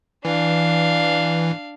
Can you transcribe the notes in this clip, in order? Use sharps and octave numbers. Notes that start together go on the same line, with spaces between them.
E3 D4 F5